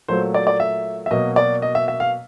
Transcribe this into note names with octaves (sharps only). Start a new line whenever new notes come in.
A#2 F#3 A3 C5
D5
D5
E5
E5
B2 F#3 A#3 D#5
D5
D#5
E5
E5
F5